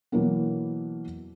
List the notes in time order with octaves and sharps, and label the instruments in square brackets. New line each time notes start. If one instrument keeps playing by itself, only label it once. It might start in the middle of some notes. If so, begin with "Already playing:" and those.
[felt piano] B2 E3 F#3 A#3 B3